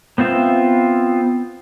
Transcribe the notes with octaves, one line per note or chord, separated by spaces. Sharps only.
B3 C4 F4 E5